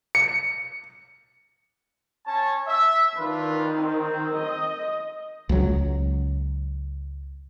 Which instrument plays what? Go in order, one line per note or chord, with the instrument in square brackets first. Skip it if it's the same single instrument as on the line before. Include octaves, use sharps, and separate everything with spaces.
[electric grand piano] C#7
[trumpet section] C#4 C#5 A5
E5
[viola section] D#3 [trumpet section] D4 F4 B4
[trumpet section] C4
[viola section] D#5
[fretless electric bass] C#2 F#3